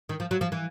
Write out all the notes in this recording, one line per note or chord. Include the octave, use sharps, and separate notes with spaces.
D#3
F3
F#3
F3
E3